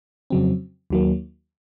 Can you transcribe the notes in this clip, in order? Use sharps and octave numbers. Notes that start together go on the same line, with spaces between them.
F2 C#3 F#3 C4
D#2 D#3 F#3 A#3